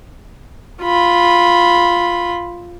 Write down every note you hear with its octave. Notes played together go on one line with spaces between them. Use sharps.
F4 B5